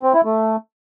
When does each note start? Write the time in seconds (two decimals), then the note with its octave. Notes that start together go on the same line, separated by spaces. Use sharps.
0.03 C4
0.14 E4
0.25 A3